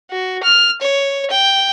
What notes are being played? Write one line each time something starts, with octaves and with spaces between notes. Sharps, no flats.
F#4
F6
C#5
G5